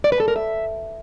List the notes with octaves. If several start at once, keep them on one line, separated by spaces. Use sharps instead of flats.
D5
B4
A4
A#4
E5